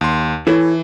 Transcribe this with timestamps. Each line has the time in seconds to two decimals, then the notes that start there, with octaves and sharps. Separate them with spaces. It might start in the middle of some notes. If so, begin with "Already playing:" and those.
0.01 D#2 C6
0.47 E3 E4 A4 C#5